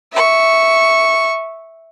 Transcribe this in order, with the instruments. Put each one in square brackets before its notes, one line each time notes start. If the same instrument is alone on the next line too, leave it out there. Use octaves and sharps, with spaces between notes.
[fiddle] E5 C#6